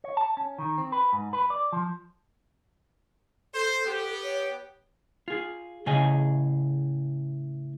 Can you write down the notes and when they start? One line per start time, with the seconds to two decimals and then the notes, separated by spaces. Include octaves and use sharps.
0.04 C#5
0.17 A5
0.37 C#4
0.58 D#3
0.78 C4
0.92 B4
1.13 G#2
1.33 B4
1.50 D5
1.72 F3
3.54 A4 C5
3.86 B3 G4
4.23 C#5
5.28 F4 G#4
5.86 A2 C#3 G#4 D#5 G#5